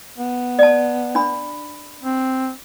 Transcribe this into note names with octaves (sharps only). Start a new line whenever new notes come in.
B3
D5 A5
D4 B5
C4